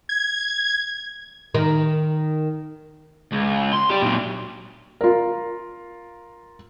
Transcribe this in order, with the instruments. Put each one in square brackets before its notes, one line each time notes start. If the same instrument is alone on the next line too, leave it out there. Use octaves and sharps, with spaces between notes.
[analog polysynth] G#6
[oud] D#3
[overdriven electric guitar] C#2
C6
G4 D5
A#2 F#3
[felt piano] F4 A#4